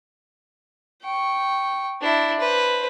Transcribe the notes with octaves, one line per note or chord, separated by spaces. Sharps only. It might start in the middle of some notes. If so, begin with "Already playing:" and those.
G5 C#6
D4 E4
B4 C5